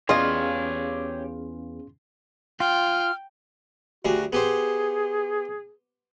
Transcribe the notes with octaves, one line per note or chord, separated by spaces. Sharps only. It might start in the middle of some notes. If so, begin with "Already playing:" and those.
E2 C#4 F4 G4 G#4 C#5 D#5 F5
F4 G5 F6
D2 G3 F#4 G#4
B3 G4 G#4 C5